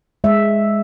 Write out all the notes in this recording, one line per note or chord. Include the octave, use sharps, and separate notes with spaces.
G#3 E5